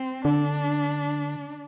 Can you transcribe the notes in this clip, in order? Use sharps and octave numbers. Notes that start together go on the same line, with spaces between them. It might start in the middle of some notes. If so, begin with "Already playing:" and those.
Already playing: C4
D3 D4